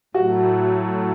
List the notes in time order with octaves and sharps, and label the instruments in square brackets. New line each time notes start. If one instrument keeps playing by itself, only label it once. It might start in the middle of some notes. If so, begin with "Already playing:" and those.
[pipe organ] A2 F#3 A3 [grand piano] F#4